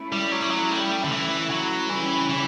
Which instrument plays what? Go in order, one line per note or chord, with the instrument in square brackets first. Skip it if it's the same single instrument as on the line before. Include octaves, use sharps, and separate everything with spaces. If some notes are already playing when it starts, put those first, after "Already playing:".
Already playing: [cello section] A3 C#4 E4
[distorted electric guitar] G3
F#3
G3
F#3
G3
D3
E3
F#3
[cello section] C#3 G3 C#4 E4 G4 [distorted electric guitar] E3
[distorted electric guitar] E3